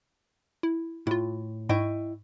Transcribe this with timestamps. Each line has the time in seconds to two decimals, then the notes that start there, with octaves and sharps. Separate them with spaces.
0.63 E4
1.07 A2 E4 F4
1.69 G#2 E4 D#5 G5 C#6